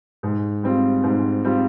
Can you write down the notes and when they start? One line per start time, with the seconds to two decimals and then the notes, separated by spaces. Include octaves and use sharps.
0.23 G#2
0.63 G3 C4 F4
1.04 G#2
1.44 G3 C4 F4